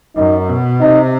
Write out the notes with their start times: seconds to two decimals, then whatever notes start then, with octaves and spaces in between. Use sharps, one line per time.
0.17 F#2 D#4
0.49 B2
0.81 C3 D#4